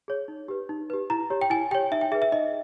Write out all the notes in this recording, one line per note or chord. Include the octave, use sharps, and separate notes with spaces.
G#4 C#5
D#4
G4 B4
D#4
G4 B4
E4 A#5
G4 C#5
G5
E4 G#5
G4 C#5 G5
D#4 E5
G5
G#4 B4 E5
E5
D#4 D#5